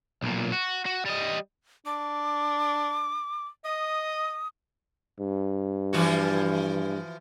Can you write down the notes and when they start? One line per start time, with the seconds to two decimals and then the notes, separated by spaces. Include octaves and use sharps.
0.23 B1 A#2
0.52 F#4
0.86 F#4
1.06 G3 D#5
1.86 D4 D6
3.65 D#5 D#6
5.19 G2
5.93 E3 F3 F#4